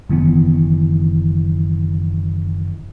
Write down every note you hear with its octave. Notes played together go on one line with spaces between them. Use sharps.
F#1 D#3 E3 B3